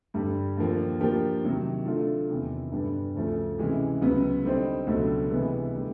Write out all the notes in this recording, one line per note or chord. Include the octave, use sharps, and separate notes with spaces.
G2 D3 G3
D#2 D3 F3 A#3
F3 A#3 D4 G4 A#4
C3 D#3 F#3
D3 F#3 A3 D4 F4
E2 C3 D#3
G2 D3 G3 B3 D4
D2 C#3 F3 A3 C#4
C3 E3 G#3 C#4
C#2 C#3 F#3 B3
D3 G3 C4 D#4
C#2 B2 F#3 A3 D4
C3 E3 G#3 B3
D3 G3 B3